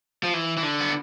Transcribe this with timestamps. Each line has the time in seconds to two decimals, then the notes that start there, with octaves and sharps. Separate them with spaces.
0.24 F3
0.34 E3
0.57 E3
0.63 D3
0.80 B3